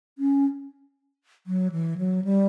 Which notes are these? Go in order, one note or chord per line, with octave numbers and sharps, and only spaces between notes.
C#4
F#3
E3
F#3
G3